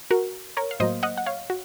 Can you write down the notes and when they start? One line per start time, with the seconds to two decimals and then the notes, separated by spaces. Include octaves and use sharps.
0.11 F#4 A#4
0.57 A#4 C#5
0.71 F5
0.80 A2 F#3 A#3 C5 D#5
1.03 D#5 F#5
1.18 F#5
1.26 C#5 F5
1.50 F#4